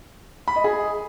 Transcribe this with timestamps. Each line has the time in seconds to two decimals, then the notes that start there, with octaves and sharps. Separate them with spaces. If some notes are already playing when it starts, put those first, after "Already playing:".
0.48 B5
0.56 D#5
0.64 G#4